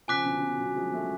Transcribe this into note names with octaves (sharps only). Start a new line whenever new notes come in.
C#3 F3 G#5 D6 F#6 B6
B2 D3
B2 D3
D3 F#3
F3 G#3
F#3 A3